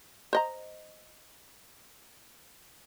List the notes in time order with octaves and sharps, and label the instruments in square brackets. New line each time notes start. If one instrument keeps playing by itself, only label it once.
[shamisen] C5 D#5 A#5